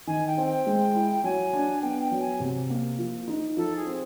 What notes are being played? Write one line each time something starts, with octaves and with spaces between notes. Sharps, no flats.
D#3 G#5
G5
C4
G5
G#3
E4
F#3 G#5
D4
B3 G5
G5
F#3
G#5
C3
A#3
F3
D#4
F3 A4
G#4
C4